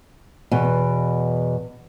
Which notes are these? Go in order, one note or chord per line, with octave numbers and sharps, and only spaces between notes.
E2 B2